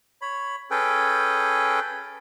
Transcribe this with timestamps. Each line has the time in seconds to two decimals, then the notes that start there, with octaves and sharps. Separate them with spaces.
0.22 C#5 B5
0.71 C#4 G#4 A4 B4 G5